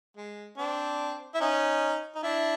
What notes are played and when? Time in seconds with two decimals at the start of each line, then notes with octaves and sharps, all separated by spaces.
0.17 G#3
0.58 C4 D4
1.35 E4
1.41 C#4 D#4
2.16 D#4
2.23 D4 E4